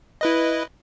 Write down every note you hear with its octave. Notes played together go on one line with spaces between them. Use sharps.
E4 B4 D#5